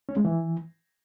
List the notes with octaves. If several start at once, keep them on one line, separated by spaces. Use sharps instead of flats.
C#4
G#3
E3